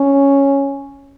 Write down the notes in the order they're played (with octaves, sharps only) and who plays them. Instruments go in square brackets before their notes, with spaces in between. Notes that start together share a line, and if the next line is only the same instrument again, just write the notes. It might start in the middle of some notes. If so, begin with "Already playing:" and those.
Already playing: [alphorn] C#4